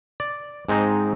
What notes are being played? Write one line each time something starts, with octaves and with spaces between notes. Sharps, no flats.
D5
G#2 G#3 C4 D#4